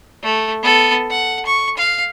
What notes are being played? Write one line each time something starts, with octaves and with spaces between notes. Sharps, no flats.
A3
B3 A4
F#5
C#6
F5